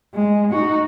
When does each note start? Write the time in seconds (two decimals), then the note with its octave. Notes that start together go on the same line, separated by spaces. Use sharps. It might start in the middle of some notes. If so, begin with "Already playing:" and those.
0.14 G#3
0.51 D#4 F#4